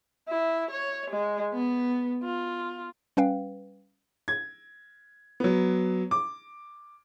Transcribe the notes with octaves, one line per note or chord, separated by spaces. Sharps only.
E4
C#5
G#3
B3
F4
G3 C#4 B4 F5 G5
G#6
F#3 B3
D6